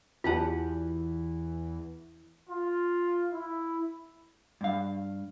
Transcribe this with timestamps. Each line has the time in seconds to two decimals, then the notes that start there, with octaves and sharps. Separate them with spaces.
0.24 E2 E3 F4 G4 F#5 A5
2.48 F4
3.32 E4
4.61 G2 F5